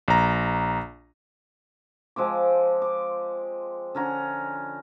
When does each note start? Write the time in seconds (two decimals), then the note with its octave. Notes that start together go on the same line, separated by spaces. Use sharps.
0.08 A#1 A#5
2.16 F3 G#3 C4 D6
2.82 D6
3.95 D3 C#4 A#5